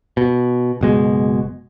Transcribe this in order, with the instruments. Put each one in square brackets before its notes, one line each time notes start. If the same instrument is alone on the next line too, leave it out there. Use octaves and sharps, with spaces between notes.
[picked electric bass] B2
F#1 B2 G#3